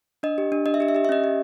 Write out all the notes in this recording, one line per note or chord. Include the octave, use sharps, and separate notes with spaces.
D4 D#5
G4
D4
D4 D#5
E5
G4 D#5
E5
G4 D#5
E5
C#4 D#5
G4